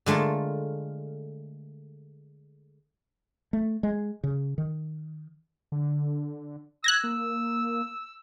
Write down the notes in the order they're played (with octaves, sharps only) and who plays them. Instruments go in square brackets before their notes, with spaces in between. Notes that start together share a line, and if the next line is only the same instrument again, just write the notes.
[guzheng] D3 G#3 A3 F4 A#4
[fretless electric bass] A3
G#3
C#3
D#3
[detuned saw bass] D3
[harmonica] E6 [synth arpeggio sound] F#6 G#6 A#6
[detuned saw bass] A#3